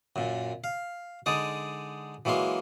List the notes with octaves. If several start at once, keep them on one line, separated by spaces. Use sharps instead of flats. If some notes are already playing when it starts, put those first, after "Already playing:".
F#2 A#2
F5
D3 G#3 D#4 D5 D#6
E3 F#3 G#3 A#3 C6